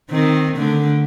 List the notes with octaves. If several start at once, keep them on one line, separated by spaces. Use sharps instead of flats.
D#3 C4
D3 A3